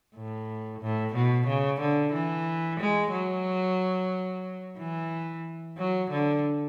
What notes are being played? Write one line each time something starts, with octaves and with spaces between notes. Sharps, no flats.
A2
A2
B2
C#3
D3
E3
G#3
F#3
E3
F#3
D3